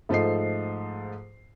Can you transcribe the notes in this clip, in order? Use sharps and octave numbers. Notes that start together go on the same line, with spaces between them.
G#2 F3 A3 D#5 C7